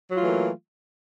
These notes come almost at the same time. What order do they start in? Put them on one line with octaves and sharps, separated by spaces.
F#3 F4 A3 E3 A#3